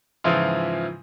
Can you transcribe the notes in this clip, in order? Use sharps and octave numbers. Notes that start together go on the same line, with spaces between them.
G#2 C#3 E3 F3 E4 F4